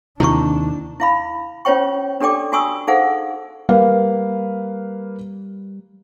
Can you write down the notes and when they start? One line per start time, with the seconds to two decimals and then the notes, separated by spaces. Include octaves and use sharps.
0.20 D#2 C3 D#3 D4 E4 C#6
1.00 E4 F5 B5
1.65 C#4 F4 C5 C#5 G5 C#6
2.21 D4 G4 A4 D5 G5 D6
2.52 F4 F#4 G#5 C#6 D#6 E6
2.87 D#4 G#4 A4 C5 F5 F#5
3.69 G3 A#3 B4 F5